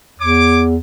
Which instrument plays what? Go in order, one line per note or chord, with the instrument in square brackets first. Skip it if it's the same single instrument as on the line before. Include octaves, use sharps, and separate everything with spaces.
[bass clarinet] E2 [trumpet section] C#5 D6